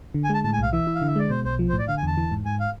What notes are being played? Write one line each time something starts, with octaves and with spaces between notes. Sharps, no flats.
D3
G#5
G#3 A5
A2 A5
G#5
B1 F5
E3 E5
E4
F5
D3
E5
G#3 D5
B2 C5
B1 C5
F3
C5
A2
D5
D3 F5
G#5
E2 A5
E3
G#2
G#2 G#5
F5